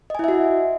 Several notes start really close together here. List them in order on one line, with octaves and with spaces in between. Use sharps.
D#5 G#5 E4 E5 F#4